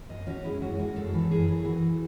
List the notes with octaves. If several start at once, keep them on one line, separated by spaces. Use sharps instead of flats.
F#2 D#5
C#4 F#4
G#3 E4
F#2 F#4
G#3 F#4
F#2 A4
E3
F#2 G#4
E3
E3 F#4